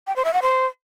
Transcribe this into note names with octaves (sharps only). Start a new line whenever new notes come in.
G5
C5
E5
F#5
C5